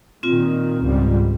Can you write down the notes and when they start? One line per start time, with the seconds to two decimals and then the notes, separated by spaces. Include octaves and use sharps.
0.23 A#2 D#3 C4 F4
0.81 C#2 G#2 G3